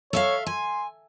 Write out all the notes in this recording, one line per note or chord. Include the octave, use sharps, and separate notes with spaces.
A4 C#5 E5 F5
G#5 C6